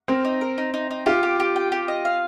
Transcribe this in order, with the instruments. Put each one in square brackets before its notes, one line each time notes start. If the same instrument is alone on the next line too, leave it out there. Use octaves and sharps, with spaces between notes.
[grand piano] C4 [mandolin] A#4
[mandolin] D#4
A#4
D#4
D#4
D#4
[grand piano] F4 [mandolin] G4
[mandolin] G4
G4
G5
G4
D#5
F5